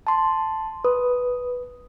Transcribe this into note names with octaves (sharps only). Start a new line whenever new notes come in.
A5 C6
B4 D#6